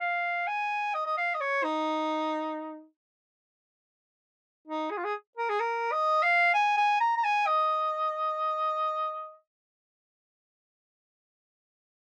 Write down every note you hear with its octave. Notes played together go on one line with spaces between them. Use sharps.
F5
G#5
D#5
D#5
F5
D#5
C#5
D#4
D#4
G#4
F4
G#4
A#4
G#4
A#4
D#5
F5
G#5
G#5
A#5
A#5
G#5
D#5